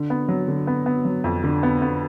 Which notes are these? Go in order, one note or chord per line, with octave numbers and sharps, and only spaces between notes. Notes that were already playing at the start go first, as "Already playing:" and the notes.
Already playing: D3
B3
F#3
D3
B3
B3
F#3
F2
D3
B3
B3